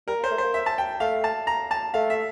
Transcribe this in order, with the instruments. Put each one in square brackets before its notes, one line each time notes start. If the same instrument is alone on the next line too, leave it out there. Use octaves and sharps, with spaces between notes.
[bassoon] G3 [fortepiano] A#4
[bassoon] A#3
[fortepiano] C5
[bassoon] A3
[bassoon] A#3 [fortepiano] C5
[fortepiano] E5
A5
G5
[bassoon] A3 [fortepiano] F5
[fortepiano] A5
A#5
A5
[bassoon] A3 [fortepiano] F5
[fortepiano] E5